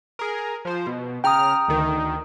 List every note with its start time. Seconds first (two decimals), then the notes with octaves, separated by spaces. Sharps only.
0.19 G#4 A#4
0.65 F3 C5
0.87 B2
1.24 C#3 G5 A#5 D#6 F6
1.68 D2 D#3